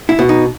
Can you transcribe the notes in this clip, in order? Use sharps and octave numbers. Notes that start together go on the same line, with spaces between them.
E4
B2
D#4